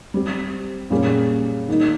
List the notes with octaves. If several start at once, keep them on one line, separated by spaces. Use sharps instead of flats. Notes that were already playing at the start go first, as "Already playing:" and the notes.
G3 C4 G4
A#2 G3 C#4 G#4
D#3 A#3 D#4